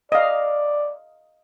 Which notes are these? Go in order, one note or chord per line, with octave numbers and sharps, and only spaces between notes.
D5 D#5 F5